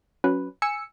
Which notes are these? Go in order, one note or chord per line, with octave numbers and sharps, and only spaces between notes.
F#3 C#4 B4
G#5 E6 C#7